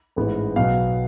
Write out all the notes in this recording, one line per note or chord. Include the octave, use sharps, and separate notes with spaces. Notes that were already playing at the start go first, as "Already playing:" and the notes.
A1 G#2 G#3 B3
B1 B2 F#3 B3 F5